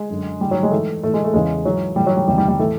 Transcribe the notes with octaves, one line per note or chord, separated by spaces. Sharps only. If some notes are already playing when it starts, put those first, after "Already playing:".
Already playing: G#3
F#2 D3
G#2 D#3 G3
F#3
G#3
G#2 E3 A3
A2 E3 A3
G#3
A3
E2 C#3 E3 G#3
G#2 E3 F#3
A2 E3 G3
F#3
G3
E2 C3 D#3 G3
G3
G3
A2 E3 A3